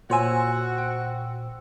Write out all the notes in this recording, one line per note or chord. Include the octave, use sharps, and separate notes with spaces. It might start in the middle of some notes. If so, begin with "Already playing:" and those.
A#2 F#4 C5 C#5 G#5 E6
G5